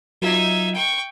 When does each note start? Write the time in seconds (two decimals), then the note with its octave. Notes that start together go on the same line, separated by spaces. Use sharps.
0.22 F#3 D#4 F4 E5 G#6
0.74 G5 C#6